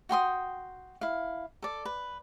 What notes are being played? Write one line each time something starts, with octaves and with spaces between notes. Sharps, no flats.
F#4 G5 C6 D#6
E4 F5
A4 D5
B4